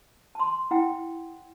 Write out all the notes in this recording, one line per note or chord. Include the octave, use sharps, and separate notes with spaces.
A5 C6
E4 F#5 G5